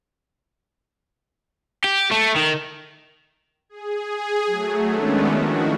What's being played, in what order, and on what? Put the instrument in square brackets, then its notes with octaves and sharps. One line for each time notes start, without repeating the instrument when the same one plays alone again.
[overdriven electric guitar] G4
A3
D#3
[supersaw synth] G#4
G#4
F#3 A3
D#3 G#3 A3 B3 C#4 D4
D#3 F3 E4 F#4